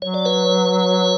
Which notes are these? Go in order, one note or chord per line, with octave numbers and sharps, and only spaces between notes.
F#3 C#5
D5
B4 C#5